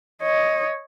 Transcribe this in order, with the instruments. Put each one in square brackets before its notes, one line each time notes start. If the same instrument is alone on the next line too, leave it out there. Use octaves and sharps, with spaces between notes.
[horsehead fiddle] C#5 D#5